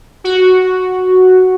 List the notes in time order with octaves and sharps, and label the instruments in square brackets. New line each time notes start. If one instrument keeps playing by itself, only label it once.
[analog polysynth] F#4